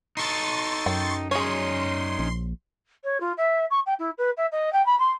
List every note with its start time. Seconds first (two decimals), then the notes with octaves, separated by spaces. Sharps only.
0.17 D#4 A4 C6 C#6 A6
0.86 F#2 G5
1.31 C#4 D#4 G#4 C#5 C6
2.19 A#1
3.04 C#5
3.20 F4
3.37 E5
3.70 C#6
3.86 G5
3.99 E4
4.18 B4
4.37 E5
4.52 D#5
4.72 G5
4.86 B5
4.99 C6